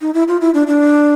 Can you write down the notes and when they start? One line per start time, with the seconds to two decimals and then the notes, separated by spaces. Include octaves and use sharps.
0.01 D#4
0.14 E4
0.28 F4
0.41 E4
0.54 D4
0.67 D4